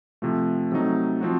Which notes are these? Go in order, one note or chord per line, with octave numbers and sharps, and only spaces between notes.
C3 F3 A3
C3 F#3 A3 D#4
F3 C4 F#4